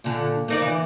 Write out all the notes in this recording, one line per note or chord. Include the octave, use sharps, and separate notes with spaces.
A#2 D3
A#3 D#4 D5
E3